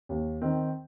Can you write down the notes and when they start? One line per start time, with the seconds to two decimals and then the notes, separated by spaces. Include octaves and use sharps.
0.09 D#2
0.42 D#3 C4